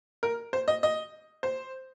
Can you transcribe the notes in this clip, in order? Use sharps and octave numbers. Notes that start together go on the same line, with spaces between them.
A#4
C5
D#5
D#5
C5